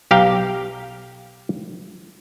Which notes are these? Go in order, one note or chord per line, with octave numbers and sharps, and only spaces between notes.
B1 G4 F5 G5 A#5